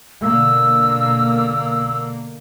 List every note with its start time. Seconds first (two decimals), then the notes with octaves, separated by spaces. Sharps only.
0.23 B2 D3 A#3 E6